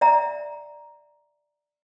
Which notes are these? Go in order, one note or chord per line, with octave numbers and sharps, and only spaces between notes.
D5 E5 G5 A#5